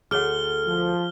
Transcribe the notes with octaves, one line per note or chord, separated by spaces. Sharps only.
D2 G#4 A4 C#5 F#5 F6 G7
F3